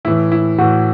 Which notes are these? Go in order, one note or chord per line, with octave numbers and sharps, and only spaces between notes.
A2 E3 E4
E4
A2 E3 F#4